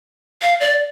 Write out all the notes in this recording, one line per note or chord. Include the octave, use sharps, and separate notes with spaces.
F5
D5